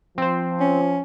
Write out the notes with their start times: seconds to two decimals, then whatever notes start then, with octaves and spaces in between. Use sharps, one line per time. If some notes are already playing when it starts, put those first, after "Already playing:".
0.18 F3 C4 C5
0.60 C#4